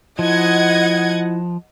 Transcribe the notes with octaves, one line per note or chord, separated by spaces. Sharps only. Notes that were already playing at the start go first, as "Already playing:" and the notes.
F3 E4 D#5 F#5 G#6